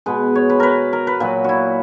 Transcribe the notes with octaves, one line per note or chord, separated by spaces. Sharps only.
B2 G#3 B4
C#5
B4
A#4 B4
A#4
B4
A#2 F#3 B4
E4 F#4